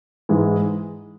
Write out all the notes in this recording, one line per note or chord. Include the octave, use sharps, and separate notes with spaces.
G#2 E3 G#3